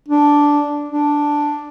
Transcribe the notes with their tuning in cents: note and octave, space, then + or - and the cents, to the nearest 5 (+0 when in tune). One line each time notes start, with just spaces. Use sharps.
D4 -5
D4 +0